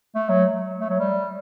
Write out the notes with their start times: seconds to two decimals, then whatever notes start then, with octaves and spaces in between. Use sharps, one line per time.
0.15 A3
0.29 F#3
0.81 A3
0.90 F#3
1.00 G3